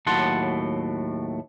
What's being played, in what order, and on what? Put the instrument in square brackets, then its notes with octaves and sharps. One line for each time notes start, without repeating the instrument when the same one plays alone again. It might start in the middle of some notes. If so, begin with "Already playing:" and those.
[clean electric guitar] D#2 A2 F#3 F#5 A5 C6